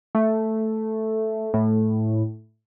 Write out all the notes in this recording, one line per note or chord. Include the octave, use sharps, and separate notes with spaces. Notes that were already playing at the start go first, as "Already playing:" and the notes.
A3
A2